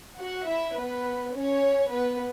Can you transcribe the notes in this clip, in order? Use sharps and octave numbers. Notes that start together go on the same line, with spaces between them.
F#4 F#5
E4 E5
B3 B4
C#4 C#5
B3 B4